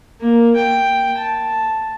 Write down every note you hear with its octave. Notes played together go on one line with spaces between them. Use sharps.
A#3
G5
A5